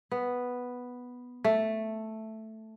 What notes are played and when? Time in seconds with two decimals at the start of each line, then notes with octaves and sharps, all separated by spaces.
0.11 B3
1.44 A3